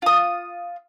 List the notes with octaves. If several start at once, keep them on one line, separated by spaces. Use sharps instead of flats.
F4 D#6